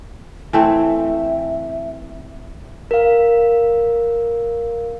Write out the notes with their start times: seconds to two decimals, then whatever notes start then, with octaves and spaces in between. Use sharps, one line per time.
0.53 E3 A3 C4 E5
2.91 A#4 F5